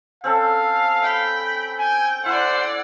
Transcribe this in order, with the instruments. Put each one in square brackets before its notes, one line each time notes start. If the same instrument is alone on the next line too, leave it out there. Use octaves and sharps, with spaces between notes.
[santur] C4 C#4 A4 [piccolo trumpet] F5
[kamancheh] G5 B5
[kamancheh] G5 [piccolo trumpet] G#5
[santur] E4 [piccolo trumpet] C5 [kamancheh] D5 F#5